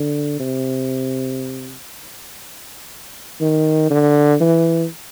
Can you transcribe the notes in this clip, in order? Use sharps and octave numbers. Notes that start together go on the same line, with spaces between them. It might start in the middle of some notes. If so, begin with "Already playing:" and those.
Already playing: D3
C3
D#3
D3
E3